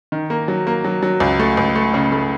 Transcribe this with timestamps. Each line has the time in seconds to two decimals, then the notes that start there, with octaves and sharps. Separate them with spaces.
0.12 D#3
0.30 A#3
0.48 F#3
0.67 A#3
0.84 F#3
1.03 F#3
1.20 C#2
1.39 A3
1.57 C#2
1.75 A3
1.94 C#3
2.12 A3